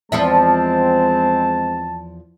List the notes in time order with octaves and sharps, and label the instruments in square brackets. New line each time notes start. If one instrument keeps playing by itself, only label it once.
[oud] E2 F3 E5 [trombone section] G#3 C4 [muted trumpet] A5